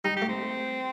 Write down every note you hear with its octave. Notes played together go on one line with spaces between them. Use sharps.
G3 D#4
G4
A3
C4